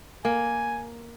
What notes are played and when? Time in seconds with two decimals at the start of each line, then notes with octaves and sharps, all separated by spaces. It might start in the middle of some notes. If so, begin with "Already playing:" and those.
0.25 A#3 G#5